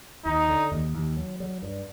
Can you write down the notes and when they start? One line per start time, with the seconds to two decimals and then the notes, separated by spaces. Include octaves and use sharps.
0.25 D#2 D#4
0.48 D3
0.71 D#2
0.94 D#2
1.17 F#3
1.40 F#3
1.62 G2